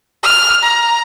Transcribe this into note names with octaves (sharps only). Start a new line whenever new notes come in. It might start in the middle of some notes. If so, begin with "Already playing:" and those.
F6
A#5